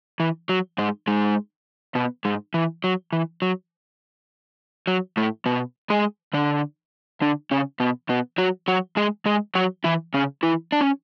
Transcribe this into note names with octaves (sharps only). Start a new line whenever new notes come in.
E3
F#3
G#2 G#3
G#2 G#3
B2 B3
G#2 G#3
E3
F#3
E3
F#3
F#3
A2 A3
B2 B3
G#3 G#4
D3 D4
D3 D4
C#3 C#4
B2 B3
B2 B3
F#3 F#4
F#3 F#4
G#3 G#4
G#3 G#4
F#3 F#4
E3 E4
C#3 C#4
E3 E4
D4
C#4